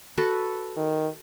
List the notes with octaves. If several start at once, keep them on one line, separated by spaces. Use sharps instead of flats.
F#4 A4 B4
D#3